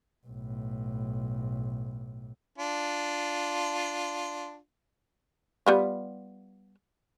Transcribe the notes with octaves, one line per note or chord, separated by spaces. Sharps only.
B1 A2
D4 F4
G3 B3 F4